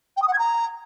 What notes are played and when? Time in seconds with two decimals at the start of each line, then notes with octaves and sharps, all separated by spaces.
0.17 G5
0.22 D#6
0.28 F#5
0.33 G#6
0.39 A#5